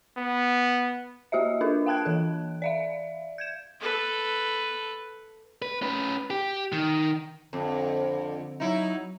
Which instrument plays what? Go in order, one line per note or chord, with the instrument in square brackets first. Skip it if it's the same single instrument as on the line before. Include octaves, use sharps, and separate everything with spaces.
[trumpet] B3
[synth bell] A#3 F#4 G4 D#5 E5
D4 F4 A4 A#4
F5 G5 A5 F#6 G#6 D7
E3 A4
D5 E5 F5
G6 G#6 E7
[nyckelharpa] A4 B4
[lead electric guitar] B4
C#4 B4
G4
D#3
[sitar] F2 [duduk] D3
[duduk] F#3 [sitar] D#4 E4